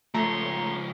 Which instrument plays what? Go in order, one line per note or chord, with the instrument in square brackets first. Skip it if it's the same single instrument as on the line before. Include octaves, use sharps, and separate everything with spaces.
[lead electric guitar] C#2 F3 [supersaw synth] A3 [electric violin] C#5 C6 [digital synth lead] A#5